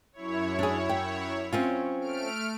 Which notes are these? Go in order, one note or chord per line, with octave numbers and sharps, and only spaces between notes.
F#2 E4 C#5
D4 G#4
G5
C4 C#4 F4
A3 F6 D7